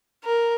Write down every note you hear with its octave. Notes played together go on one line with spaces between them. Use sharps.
A#4